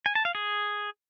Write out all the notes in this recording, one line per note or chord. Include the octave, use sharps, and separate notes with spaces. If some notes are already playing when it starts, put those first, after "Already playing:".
G#5
A5
F5
G#4